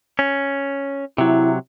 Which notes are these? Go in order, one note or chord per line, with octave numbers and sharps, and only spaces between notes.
C#4
C3 F#3 E4